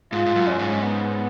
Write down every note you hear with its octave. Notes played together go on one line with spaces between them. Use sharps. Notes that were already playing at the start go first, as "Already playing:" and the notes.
G#2 F4
G#2
F#2
C#4
G#2
B3